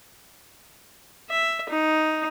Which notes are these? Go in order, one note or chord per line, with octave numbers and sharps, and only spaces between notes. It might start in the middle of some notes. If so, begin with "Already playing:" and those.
E5
D#4